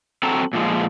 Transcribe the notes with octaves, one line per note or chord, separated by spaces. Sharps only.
F#3 C4 F#4 A4 A5 A#5
A#2 F3 G#3